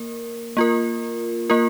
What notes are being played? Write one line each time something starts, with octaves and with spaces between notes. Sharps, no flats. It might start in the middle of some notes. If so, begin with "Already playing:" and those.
Already playing: A#3 A#4
A#3 F4 A#4
A#3 F4 A#4